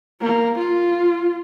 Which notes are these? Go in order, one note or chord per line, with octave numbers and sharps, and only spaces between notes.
A#3
F4